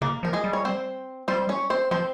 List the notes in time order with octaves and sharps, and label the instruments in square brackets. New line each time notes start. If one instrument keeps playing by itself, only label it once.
[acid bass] C#3 [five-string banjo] A#3
[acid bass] F3 [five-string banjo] A#4
[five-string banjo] G#3 G#4
[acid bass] G3
[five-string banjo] C#5
C4 C5
[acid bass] G3 [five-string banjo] C4 C5
[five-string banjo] C#4 C#5
C4 C5
[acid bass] F3 [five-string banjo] C4 C5